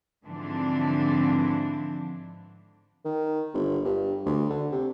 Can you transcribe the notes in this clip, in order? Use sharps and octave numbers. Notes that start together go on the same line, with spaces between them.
G#2 D3 E3 F3 C4 D4
D#3
G1
G2
D2
D3
C3